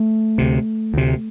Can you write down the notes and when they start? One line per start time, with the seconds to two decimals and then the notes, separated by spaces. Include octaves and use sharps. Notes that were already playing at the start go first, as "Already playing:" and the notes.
Already playing: A3
0.38 D2 C3
0.94 D2 C3